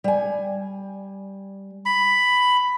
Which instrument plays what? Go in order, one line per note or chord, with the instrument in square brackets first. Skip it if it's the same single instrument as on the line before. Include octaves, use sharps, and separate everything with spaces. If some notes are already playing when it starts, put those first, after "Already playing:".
[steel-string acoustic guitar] G3 G#5
[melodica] B5